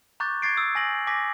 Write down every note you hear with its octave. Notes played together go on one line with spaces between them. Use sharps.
A#5 C#6 D6 F#6 G6 A6
A#5 C#6 G#6 A6 C7 D7
D#6 E6
G#5 A#6 F#7
G#5 D6 A#6 B6